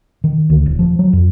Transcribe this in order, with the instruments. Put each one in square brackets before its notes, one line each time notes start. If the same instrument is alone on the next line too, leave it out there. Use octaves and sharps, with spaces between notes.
[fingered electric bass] D#3
D2
D#1
F3
F#3
F2